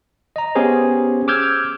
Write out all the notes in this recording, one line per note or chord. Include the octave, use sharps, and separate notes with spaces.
D#5 A#5
B3 C#4 G4 G#4 C5 C#5
D6 E6 F6 G6 G#6